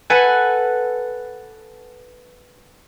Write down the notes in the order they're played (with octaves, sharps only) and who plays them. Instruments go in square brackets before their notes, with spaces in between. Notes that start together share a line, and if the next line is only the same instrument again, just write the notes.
[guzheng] A4 B4 F#5 G#5